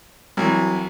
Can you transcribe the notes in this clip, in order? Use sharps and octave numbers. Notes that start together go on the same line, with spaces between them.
C2 E3 F#3